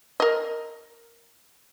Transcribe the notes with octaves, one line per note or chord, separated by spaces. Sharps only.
A#4 D#5